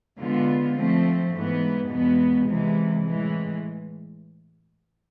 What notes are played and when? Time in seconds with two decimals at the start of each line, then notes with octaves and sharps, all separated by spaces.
0.18 D3 G#3 B3 F4
0.76 F3 A3 C4
1.33 G#2 E3 B3
1.90 E2 B2 G#3 B3
2.48 C3 E3 G#3
3.05 A2 E3 G#3